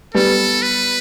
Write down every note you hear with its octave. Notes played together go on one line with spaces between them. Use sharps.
G3 B3 A4
B4